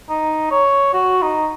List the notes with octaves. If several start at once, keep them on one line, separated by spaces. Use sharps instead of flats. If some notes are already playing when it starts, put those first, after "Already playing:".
D#4
C#5
F#4
D#4